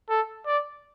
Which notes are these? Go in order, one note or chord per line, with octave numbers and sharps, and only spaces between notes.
A4
D5